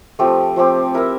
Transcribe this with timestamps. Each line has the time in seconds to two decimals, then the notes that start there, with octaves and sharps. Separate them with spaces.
0.19 F3 A3 C4 G4
0.56 F3 A3 C4 G4
0.94 E4 A#4 E5